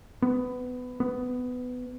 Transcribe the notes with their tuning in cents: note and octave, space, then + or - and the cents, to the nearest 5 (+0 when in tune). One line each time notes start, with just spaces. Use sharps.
B3 +20
B3 +15